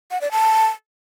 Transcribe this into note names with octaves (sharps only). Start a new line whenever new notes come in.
F#5
D5
A5